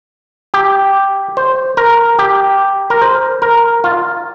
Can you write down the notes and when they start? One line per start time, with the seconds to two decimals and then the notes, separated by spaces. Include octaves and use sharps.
0.54 G4
1.37 C5
1.77 A#4
2.19 G4
2.90 A#4
3.02 C5
3.42 A#4
3.84 F4